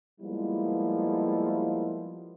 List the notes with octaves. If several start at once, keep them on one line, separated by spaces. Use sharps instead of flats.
F3 G3 G#3 A#3 B3 E4